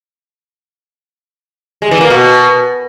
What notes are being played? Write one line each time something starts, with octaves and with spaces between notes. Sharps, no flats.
G#3
E3
A#3
B2